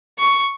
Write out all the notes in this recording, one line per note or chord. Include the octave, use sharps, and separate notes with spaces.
C#6